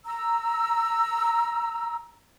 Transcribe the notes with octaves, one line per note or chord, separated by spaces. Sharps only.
A#5 E6